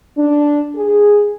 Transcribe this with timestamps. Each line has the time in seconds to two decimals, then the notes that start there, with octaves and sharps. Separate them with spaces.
0.17 D4
0.75 G#4